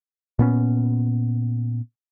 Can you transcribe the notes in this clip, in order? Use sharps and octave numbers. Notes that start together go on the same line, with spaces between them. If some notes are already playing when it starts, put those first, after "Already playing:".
A#2 B3 C#4